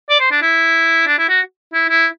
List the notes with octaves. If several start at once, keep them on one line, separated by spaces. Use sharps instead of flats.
D5
C5
D4
E4
D4
E4
F#4
E4
E4